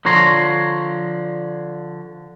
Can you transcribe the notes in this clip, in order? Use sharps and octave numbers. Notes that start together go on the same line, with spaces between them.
D3 F3 C#5 A#5 C6